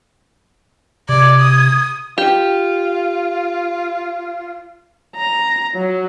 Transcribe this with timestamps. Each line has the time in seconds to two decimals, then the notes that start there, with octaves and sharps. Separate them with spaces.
1.09 C3 D5 G#6
1.40 D#6
2.18 F4 G4
5.16 A#5
5.75 F#3